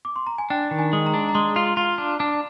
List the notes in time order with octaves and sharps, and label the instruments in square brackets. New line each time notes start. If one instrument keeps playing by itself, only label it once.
[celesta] D6
C6
A#5
G#5
[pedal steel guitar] D4 [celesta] G5
[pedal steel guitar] D#3
[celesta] G#5
[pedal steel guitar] G#3
[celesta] A#5
[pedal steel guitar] D4
[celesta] A#5
[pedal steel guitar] G#3 [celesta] C6
[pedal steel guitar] F4
F4
D4
D4